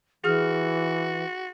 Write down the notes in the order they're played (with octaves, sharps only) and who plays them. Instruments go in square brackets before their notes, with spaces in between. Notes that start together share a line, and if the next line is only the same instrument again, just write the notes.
[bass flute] E3 [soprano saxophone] F#4 [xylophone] G#4 F6